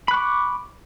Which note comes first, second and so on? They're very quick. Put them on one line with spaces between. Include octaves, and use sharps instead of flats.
B5 F#6 C#6 D6